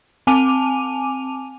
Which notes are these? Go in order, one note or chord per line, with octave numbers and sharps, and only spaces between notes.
C4 G#5 A5 D6 D#7 F7